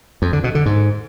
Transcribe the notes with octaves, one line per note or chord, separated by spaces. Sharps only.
F2
D3
B2
D3
G#2